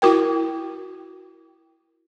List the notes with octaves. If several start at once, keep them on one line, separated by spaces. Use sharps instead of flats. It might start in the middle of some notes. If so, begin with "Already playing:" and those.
E4 F#4 A#4 G5